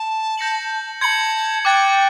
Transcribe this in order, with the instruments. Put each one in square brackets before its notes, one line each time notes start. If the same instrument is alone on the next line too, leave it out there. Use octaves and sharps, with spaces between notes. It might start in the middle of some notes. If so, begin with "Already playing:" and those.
Already playing: [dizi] A5
[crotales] G6 A#6 C#7 F#7
[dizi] A5 C6 [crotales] G#6 C#7 F#7
[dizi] G5 [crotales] D6 F#6 A6